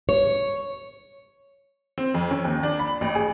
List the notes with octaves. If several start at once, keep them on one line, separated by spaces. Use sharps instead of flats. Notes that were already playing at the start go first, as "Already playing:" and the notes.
C#5
C4
F2
C#4
D#2
D4
B5
A1
G#4